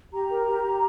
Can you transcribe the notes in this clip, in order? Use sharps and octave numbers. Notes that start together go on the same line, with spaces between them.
G4 A#5
A#4
G4
G4